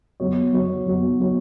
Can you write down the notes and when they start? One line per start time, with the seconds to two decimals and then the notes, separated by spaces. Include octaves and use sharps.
0.20 F#3 B3 F#4 C#5
0.53 F#3 B3 F#4 C#5
0.86 F#3 B3 F#4 C#5
1.19 F#3 B3 F#4 C#5